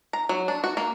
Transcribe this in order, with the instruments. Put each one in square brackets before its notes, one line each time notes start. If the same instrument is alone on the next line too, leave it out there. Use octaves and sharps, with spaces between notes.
[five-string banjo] A#5
F#3
D4
F#4
A#3